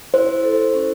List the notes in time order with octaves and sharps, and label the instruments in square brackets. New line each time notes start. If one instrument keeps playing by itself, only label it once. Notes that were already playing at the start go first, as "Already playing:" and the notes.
[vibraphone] E4 [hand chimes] C5
[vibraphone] A4
C#4